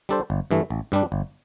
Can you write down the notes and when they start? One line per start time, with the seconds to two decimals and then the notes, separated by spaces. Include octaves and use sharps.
0.09 G3 D4 A4 C5
0.30 G1
0.51 G2 E3 A3
0.70 A1
0.92 G2 G3 D4
1.12 G1